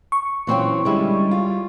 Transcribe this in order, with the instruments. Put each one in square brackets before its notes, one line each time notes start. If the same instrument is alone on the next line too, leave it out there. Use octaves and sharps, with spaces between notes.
[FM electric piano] C#6
[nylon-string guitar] A#2 C4 G5 [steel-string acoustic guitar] E3 F#3 C#4
[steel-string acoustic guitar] D3 G#3 [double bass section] G3 [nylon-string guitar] C#4 E4 G4
[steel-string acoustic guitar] F4